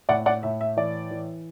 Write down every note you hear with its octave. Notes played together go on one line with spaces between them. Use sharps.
A2 D5 F#5
D5 F#5
A2 E5
E5
E3 D5
E3